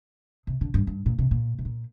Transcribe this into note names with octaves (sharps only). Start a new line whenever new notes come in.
C3
D3
G2
G2
A#2
C3
A#2
C3
A#2